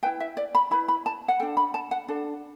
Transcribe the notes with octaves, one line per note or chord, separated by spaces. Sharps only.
E4 B4 G5
E5
D5
B5
E4 B4 B5
B5
A5
F#5
D4 A4 G5
B5
A5
F#5
D4 A4